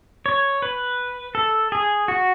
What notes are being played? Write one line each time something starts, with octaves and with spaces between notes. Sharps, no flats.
C#5
B4
A4
G#4
F#4